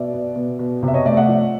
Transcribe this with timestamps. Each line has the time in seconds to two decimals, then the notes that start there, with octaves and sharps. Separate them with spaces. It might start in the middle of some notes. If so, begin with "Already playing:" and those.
Already playing: B2 D5 E5
0.13 B3
0.36 B2
0.59 B2
0.83 C3
0.88 E5
0.94 C#5 D#5
1.05 A3 D5 E5
1.17 E5 F#5
1.28 F3